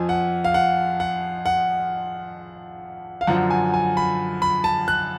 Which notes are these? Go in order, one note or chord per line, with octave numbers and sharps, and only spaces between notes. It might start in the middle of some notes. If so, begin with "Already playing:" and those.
Already playing: F2 F3 G#5
F#5
F5
F#5
F#5
F#5
F5
F#2 D3 F3 F#5
G#5
G#5
B5
B5
A5
F#6